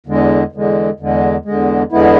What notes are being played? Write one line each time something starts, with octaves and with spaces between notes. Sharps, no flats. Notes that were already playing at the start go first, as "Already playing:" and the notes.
E2 D3 G#3
E2 D3 G#3
E2 D3 G#3
E2 D3 G#3
E2 D3 G#3 B3 E4